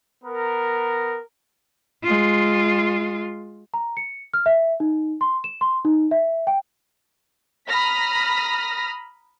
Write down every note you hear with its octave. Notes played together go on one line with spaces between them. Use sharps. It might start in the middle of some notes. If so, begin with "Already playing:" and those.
B3 A#4
G#3 F4
A#5
C#7
F6
E5
D#4
C6
E7
C6
D#4
E5
G5
A#5 B5 D#6 F6 A#6 B6